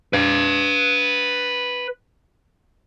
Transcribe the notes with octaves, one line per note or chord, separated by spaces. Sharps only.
B4 F5